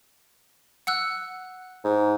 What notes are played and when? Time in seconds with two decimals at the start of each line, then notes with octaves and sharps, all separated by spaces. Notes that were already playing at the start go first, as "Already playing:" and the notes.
0.87 F#5 E6 F#6
1.85 G#2